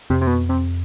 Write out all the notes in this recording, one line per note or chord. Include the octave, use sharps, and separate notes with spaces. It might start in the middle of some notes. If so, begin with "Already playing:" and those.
F2 C3
C3
B2
C3